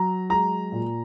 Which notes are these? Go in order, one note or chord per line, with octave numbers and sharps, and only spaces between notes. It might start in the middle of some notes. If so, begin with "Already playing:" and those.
Already playing: F#3 A#5
G#3 A#5
A#2